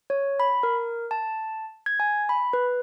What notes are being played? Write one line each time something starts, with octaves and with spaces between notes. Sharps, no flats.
C#5
B5
A#4
A5
G#6
G#5
B5
B4